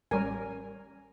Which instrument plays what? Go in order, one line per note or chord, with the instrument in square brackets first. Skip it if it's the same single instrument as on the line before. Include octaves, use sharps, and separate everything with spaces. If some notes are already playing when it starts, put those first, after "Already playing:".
[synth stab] A1 G3 C#4 [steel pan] A#4 G#5